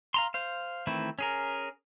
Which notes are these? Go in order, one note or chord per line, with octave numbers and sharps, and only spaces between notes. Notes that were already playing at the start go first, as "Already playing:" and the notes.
F5 A#5 C6
C5 F5
D#3 E3 A3 C4 E4
C#4 G#4 A#4